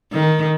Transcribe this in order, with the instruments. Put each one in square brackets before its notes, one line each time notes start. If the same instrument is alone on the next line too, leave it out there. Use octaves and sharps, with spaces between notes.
[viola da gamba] D#3